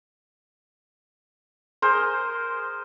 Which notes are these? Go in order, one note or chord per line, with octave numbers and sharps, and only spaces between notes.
G#4 A#4 C5